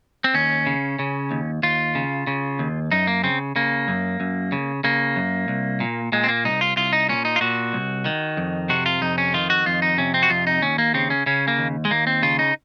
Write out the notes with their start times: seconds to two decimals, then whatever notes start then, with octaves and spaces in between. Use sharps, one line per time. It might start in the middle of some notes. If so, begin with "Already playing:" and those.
0.24 C4
0.34 D#2 C#4
0.66 C#3
0.99 C#3
1.31 D#2
1.63 D#2 F4
1.95 C#3
2.27 C#3
2.59 D#2
2.92 F#2 D#4
3.07 A#3
3.23 C#3 C4
3.56 C#3 A#3
3.88 F#2
4.20 F#2
4.52 C#3
4.84 C#3 A#3
5.16 F#2
5.48 C2
5.80 A#2
6.12 A#2 G#3
6.24 C4
6.29 A#3
6.44 C2 D#4
6.61 F4
6.77 C2 F4
6.93 D#4
7.09 A#2 C#4
7.25 D#4
7.36 F4
7.41 A#2 F#4
7.73 C2
8.06 D#3
8.37 F2
8.69 C3 F#4
8.86 F4
9.02 F2 D#4
9.18 C#4
9.34 D#3 F4
9.50 F#4
9.66 F2 F4
9.82 D#4
9.98 C3 C#4
10.14 C4
10.23 F#4
10.30 F2 F4
10.47 D#4
10.62 D#2 C#4
10.78 A#3
10.94 C#3 C4
11.10 C#4
11.26 C#3 C#4
11.48 A#3
11.58 D#2
11.85 G#3
11.91 D#2 A#3
12.07 C4
12.23 C#3 F4
12.39 D#4